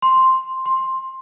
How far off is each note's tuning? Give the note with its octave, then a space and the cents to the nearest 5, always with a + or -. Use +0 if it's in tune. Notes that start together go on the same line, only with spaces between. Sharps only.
C6 +0
C6 +10